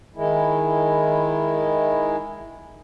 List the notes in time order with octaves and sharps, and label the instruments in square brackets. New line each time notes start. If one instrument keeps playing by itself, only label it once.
[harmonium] D#3 G#3 E4